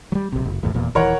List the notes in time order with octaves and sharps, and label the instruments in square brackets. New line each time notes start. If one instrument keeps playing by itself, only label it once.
[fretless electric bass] F#3 G3
A#1 C3
F#1
G#1 E2 A2
D#1 E2 A#2
[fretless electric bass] D#1 E3 [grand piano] A#4 C#5 F#5